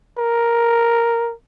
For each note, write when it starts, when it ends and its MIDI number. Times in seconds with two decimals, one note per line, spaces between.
0.18 1.33 70